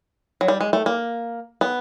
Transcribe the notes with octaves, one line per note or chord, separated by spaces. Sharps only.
F#3
G3
G#3
A3
A#3
B3